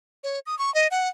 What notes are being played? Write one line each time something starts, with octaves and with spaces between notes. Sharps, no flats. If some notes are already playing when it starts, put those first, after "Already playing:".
C#5
D#6
C#6
D#5
F#5